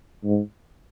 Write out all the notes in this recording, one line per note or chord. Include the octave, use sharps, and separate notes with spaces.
G#2